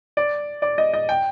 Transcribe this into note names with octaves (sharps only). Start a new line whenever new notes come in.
D5
D5
D#5
D#5
G5